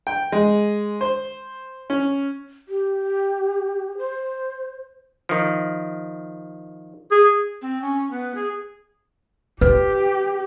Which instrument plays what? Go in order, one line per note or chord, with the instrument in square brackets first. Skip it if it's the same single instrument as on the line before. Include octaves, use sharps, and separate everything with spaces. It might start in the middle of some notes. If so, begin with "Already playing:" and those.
[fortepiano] G5
G#3
C5
C#4
[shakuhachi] G4
C5
[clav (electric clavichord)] D#3 F3
[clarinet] G#4
[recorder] C4
C#4
B3
G#4
[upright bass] F4 [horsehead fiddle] G4 [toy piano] B4